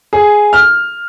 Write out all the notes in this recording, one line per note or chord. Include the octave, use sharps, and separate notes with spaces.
G#4
F6